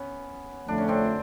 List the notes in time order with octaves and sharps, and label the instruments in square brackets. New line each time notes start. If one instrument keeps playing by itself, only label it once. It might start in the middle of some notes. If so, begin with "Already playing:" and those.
Already playing: [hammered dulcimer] B3 C#4
[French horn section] F2 D3 F3 A3 [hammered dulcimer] D4
[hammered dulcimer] C#4
C4 D4